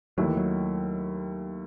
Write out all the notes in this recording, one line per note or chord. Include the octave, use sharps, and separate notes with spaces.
D#2 D#3 F#3 A3 E4
E3
F#3